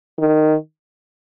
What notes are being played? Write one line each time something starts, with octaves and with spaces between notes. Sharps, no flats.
D#3